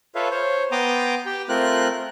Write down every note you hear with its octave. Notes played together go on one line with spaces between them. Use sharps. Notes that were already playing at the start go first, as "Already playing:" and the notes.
F4 A4 B4 C#5 E5 F5
C5 C#5
B3 G5 A#5 C6 D6 D#6
G4 G5
A3 C4 F4 A#4 F#6